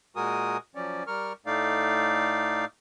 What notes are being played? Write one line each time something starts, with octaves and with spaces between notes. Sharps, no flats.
A#2 G#3 F#4 A#4 G#5 D#6
F3 F#3 C#4 D5
G3 A#4 C#6 F6
A2 A3 D#4 D5 F5